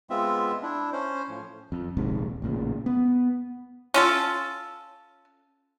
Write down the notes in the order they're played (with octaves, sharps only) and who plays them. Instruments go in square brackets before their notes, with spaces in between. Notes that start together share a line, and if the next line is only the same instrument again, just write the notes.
[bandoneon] G#3 B3 C4 F4 E5
D4 E4
C#4 C5
A2 F3
[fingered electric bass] F2
D#1 A#1 G#2 C3
A1 A#2 C#3
B3
[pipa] C#4 F4 A4